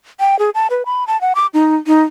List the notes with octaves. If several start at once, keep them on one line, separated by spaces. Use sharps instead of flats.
G5
G#4
A5
B4
B5
A5
F#5
D6
D#4
D#4